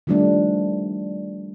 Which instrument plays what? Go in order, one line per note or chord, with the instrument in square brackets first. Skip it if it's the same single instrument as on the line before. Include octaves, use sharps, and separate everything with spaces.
[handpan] D#3 F3 G3 A3 D4